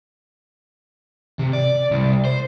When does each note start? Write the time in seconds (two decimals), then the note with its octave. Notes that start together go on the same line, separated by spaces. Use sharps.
1.39 C3
1.53 D5
1.91 C2
2.25 C5